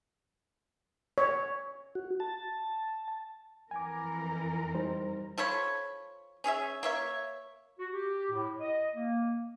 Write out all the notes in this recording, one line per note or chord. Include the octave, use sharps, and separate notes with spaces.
C#5
F#4
A5
F2 E3 A#4 G#5 D6
G3 D#4 C5
F3 A4 C#5 B5
C#4 G#4 C#5 E5
A#3 C#5 E5
F#4
G4
A2
D#5
A#3